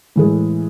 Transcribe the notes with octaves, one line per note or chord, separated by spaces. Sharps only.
A2 E3 G#3